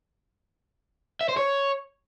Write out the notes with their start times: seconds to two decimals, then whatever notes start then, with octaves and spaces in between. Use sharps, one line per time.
1.21 E5
1.29 C5
1.37 C#5